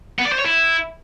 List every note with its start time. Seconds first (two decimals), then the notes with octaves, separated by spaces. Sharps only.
0.19 B3
0.25 D5
0.32 C5
0.39 C#5
0.46 E4